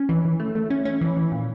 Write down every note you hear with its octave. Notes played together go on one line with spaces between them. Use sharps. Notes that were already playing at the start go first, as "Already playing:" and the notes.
Already playing: C#4
E3
E3
A3
A3
C#4
C#4
E3
E3
A#2